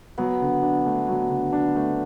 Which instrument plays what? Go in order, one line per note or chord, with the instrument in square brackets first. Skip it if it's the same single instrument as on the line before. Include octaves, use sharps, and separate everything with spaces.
[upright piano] F#3 [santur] B3
[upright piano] D3
D4
A3
F#3
D3
D4
A3